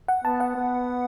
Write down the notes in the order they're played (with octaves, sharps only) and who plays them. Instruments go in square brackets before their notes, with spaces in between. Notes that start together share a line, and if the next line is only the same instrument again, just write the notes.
[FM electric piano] F#5
[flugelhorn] B3 [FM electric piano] A5
[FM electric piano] F#5
[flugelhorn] B3